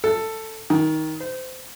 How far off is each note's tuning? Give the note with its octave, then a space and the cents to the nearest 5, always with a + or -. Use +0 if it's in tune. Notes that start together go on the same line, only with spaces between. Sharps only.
A4 +10
D#3 +15
C5 -25